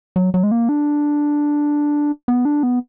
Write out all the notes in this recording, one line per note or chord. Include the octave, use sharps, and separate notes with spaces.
F#3
F#3
G#3
A#3
D4
B3
D4
B3